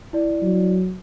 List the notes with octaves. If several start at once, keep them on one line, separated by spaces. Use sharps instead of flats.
E4 D5
F#3